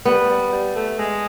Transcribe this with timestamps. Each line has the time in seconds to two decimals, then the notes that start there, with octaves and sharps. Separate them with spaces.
0.05 G3 B3
0.29 G3
0.52 G3
0.76 A3
0.99 G#3